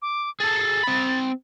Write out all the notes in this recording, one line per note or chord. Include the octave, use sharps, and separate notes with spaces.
D6
G#4 A4 A6
C4 B5